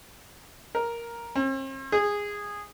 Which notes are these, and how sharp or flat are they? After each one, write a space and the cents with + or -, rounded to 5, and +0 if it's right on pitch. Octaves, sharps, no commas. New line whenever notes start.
A#4 +5
C4 +45
G#4 -15